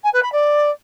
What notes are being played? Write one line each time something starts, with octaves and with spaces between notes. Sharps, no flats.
G#5
B4
B5
D5